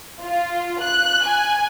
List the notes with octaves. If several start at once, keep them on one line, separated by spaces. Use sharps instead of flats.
F4
F#6
G#5